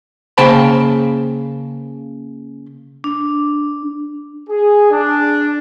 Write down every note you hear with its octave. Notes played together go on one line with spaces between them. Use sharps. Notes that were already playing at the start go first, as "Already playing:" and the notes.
C#3 A#3 C5 G5 A5 B5
D4
G#4
D4